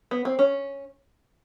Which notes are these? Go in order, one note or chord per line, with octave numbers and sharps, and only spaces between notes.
B3
C4
C#4